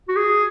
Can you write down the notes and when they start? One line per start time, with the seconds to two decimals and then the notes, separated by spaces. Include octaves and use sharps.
0.08 F#4
0.16 G#4